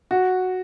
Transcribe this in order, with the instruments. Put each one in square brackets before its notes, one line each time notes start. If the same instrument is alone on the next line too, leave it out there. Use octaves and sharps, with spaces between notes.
[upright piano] F#4